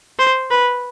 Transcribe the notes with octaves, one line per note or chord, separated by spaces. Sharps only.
C5
B4